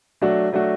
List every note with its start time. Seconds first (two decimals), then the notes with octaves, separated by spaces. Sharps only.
0.21 F#3 A3 D4 F#4
0.53 F#3 A3 D4 F#4